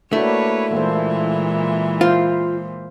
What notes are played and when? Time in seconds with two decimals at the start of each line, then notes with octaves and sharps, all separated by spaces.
0.13 A3 A#3 D4 E4 F#4 B4 C#5
0.72 A#2 E3 G#3 A#3 A4 C5
2.01 F4 C5 F5